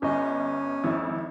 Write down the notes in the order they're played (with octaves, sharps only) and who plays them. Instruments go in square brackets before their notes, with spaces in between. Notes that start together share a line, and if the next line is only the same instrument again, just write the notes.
[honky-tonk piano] G1 D#5 [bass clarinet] C#4
[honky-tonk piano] G#1 F2 E4